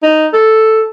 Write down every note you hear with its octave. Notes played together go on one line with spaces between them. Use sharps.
D#4
A4